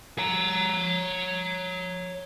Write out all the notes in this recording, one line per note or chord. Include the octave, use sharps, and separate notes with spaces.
C#5 A#5